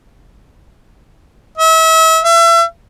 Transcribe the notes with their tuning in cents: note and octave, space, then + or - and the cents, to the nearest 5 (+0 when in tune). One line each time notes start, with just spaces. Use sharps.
E5 -35
E5 +35